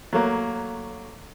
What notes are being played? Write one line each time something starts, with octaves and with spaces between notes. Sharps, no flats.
F#3 A3 A#3